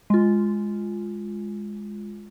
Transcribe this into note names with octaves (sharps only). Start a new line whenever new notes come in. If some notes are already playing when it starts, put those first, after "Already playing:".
G#3 F4